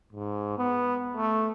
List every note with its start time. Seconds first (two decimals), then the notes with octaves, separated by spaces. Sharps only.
0.13 G#2
0.58 B3
1.17 A3